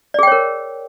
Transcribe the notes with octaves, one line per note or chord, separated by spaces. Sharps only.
G#4 A#4 C#5 D5 G5